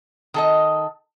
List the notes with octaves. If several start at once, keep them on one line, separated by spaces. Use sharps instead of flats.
D#3 A4 D#5